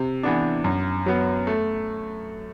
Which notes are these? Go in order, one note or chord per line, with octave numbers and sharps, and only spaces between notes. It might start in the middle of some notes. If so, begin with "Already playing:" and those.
Already playing: C3
E3 B3 D4
F#2
F#3 B3
A3